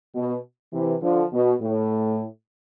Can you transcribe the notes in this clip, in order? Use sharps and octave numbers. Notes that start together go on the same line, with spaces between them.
B2
C3 E3
D3 F3
B2
A2